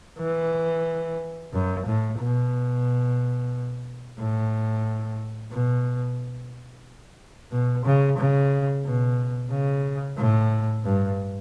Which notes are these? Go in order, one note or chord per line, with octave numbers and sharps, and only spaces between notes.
E3
F#2
A2
B2
A2
B2
B2
C#3
C#3
B2
C#3
A2
G2